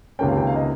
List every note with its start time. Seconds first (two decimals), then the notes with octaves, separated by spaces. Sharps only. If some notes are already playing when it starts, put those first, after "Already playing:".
0.19 C#2 C3 D#3 A#3 C#4 G5
0.28 F5
0.37 G5
0.47 F5
0.56 D#5